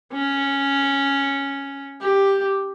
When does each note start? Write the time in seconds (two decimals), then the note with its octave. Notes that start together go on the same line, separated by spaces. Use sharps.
0.13 C#4
2.01 G4